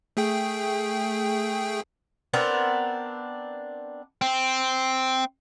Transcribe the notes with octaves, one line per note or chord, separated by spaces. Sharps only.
A3 G#4 G5
B3 C4 D4 A#4
C4